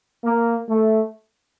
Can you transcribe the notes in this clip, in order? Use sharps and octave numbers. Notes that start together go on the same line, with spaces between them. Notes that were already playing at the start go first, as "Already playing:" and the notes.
A#3
A3